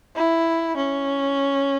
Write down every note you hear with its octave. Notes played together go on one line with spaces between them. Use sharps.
E4
C#4